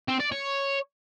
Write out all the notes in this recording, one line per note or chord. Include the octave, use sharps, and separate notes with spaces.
C4
D5
C#5